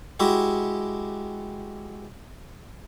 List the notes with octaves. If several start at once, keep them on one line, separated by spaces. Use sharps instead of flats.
G#3 E4 F#4 G4